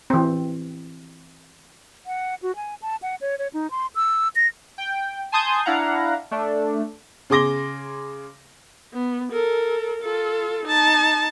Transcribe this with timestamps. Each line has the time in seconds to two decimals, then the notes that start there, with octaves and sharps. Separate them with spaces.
0.10 E3 C4
2.06 F#5
2.43 F#4
2.56 G#5
2.82 A5
3.02 F#5
3.21 C#5
3.39 C#5
3.54 D#4
3.71 C6
3.95 E6
4.35 A#6
4.78 G5
5.32 G#5 A5 C6 D#6 G6 G#6
5.65 D4 E4 F5 F#5 A#5
6.31 A3 D4
7.30 C#3 G#4 C6 D6 A#6 G7
8.93 B3
9.32 A4 A#4
10.02 F4 A4
10.65 D#4 A5